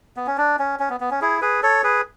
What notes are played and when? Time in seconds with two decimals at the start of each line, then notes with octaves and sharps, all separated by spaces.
0.16 B3
0.27 C#4
0.37 D4
0.59 C#4
0.80 C#4
0.90 B3
1.00 B3
1.11 C#4
1.21 E4 G#4
1.41 G#4 B4
1.63 A4 C#5
1.84 G#4 B4